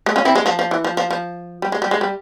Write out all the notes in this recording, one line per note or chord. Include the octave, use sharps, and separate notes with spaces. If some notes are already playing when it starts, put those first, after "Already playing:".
G#3
C#4 F4
C4 E4
G#3
F3
F3
E3
F3
F3
F3
G3
G#3
G3
G#3
G3